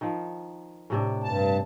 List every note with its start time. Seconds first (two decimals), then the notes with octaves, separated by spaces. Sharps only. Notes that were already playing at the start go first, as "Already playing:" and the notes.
0.01 D#3 F3
0.90 A2 C3 D4
1.24 G2 A5